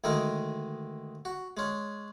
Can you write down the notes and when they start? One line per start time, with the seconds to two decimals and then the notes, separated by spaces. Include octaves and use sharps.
0.04 D2 D#3 G#3 D#4 A#4
1.25 F#4
1.57 G#3 C#4